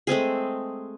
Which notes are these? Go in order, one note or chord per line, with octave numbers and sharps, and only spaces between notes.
G#3 A3 C4 G#4